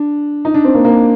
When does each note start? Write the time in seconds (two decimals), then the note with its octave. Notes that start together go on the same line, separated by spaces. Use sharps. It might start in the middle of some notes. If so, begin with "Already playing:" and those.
Already playing: D4
0.45 D#4
0.54 D4
0.64 C4
0.74 A#3
0.85 A#3